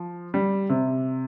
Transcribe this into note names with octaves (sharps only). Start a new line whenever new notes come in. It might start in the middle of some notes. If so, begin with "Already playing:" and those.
Already playing: F3
G3
C3